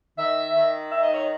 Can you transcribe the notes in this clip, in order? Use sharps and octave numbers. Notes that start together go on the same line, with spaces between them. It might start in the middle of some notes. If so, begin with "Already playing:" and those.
D#3 E5
D#3
D#4 E5
D#5
C#5